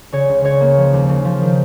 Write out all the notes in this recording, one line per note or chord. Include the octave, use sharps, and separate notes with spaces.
C#3 C#5
C#2
C#3 C#5
A#3
F3
D#2
C#3
F3
D#3